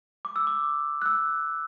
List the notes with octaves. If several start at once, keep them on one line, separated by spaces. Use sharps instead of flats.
D6
E6
D6
F#6
E6